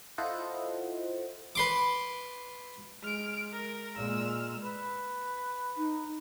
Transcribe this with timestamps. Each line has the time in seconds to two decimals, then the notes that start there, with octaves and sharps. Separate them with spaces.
0.18 E4 F4 A4 C5 D#5 F#5
1.55 B4 C6 D6
3.03 G#3 F6 D7
3.52 A#4
3.96 A#2 G#3 E6 F6
4.63 B4
5.77 D#4